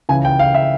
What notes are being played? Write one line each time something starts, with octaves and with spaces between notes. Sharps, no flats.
C#2 C#3 E3 G#5
G5
F5
E5